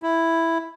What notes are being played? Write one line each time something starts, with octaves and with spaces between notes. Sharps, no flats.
E4